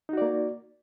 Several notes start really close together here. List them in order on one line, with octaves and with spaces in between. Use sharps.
D#4 F#4 D5 A#3